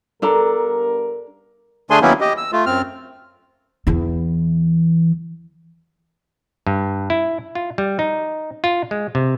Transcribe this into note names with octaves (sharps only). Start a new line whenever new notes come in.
G2 B3 D4 A4 A#4 A#5
D3 A3 D4 G#4 G#5 C6
D#3 F#3 A#3 B3 C#4 E4
G4 D#5
E6
A3 F4
F#2 C4 F6
E2 E3
G2
E4
F4
G3
D#4
F4
G#3
C3